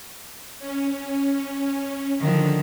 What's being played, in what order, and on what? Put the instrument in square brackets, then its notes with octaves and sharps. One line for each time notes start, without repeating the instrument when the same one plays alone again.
[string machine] C#4
[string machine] D3 [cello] D#3 F3